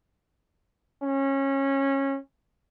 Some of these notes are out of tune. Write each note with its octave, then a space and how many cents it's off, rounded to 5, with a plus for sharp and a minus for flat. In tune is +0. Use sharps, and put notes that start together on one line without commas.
C#4 -20